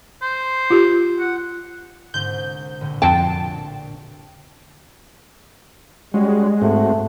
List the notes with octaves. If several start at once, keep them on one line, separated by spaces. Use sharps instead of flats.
C5
F4 G4
F#5
C2 G#2 D3 G6
A#1 A2 D3
F2 F#4 D5 G5 A5 C7
G3 G#3 C#4 F#4
G#2 A3 C4 F#4